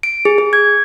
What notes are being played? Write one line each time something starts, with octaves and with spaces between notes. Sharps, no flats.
D7
G#4
G#4
G#6